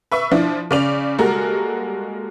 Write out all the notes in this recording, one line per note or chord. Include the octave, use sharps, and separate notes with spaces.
B4 E5 C#6
F3 D4 E4
C#3 D5 F7
G3 G#3 A#3 F#4 A4 A#4